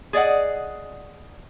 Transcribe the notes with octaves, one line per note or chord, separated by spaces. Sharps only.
G#4 D5 D#5 F#5